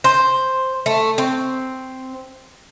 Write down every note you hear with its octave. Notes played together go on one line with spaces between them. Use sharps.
C5
A3
C4